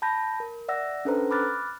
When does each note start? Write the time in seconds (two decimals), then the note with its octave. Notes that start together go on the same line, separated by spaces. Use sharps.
0.02 A5 B5 G6 A#6
0.40 A#4
0.68 D5 E5 F#5 E6 A#6
1.05 C#4 D4 A4 B4 C5 A#5
1.31 B5 D6 F6 F#6 A6